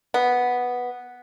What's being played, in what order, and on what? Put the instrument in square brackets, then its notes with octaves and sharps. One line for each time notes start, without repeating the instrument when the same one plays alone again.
[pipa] B3